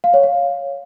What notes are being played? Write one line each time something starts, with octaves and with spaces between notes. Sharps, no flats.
F5
C#5
F5